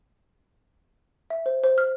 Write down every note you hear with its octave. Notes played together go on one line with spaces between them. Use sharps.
E5
C5
C5
F6